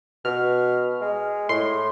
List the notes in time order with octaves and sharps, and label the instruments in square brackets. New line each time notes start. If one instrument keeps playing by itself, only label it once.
[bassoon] B2 [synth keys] F6
[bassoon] G#3
[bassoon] A2 [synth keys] C6